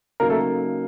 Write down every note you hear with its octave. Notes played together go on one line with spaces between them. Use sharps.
C#3 F#3 A#3 D#4 A#4
A3 A4